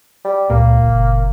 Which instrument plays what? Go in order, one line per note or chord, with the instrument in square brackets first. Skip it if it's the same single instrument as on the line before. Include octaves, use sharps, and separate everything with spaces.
[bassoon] G3
[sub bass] C#2 [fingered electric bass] A#2 [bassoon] A#3
[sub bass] F#1